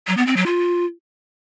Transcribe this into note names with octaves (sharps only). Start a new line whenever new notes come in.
F#3
B3
C4
F#3
F4